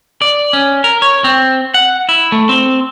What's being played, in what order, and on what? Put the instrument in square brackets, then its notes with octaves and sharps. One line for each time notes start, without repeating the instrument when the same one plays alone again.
[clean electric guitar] D5
C#4
A#4
C#5
C4
F#5
E4
A3
C4